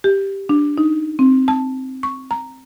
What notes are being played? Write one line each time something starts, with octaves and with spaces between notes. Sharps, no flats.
G4
D4
D#4
C4
A5
C#6
A#5